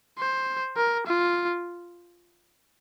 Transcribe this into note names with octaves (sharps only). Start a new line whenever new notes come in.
C5
A#4
F4